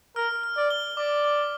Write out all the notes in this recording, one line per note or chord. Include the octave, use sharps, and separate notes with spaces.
A#4 F6
F6
D5
G7
D5 D6
D6